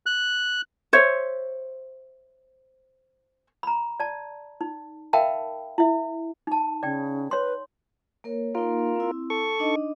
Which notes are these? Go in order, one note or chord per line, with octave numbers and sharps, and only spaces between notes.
F#6
C5 C#5 E5
A#5 B5
D5 A5
D#4
A#4 E5 F5 G5 A5 B5
E4 E5
D#4 A5
C#3 D5 G5
B4 C#5 C6
A#3 A#4 C#5
A#3 D#4 F4 A#4
C4 E4
A4 C#6
D4 D#4 D#5